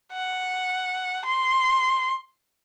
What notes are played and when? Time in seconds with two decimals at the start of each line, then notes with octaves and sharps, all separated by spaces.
0.14 F#5
1.25 C6